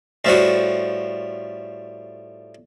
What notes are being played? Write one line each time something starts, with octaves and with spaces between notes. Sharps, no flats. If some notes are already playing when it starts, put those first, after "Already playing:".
A2 F3 G3 F#4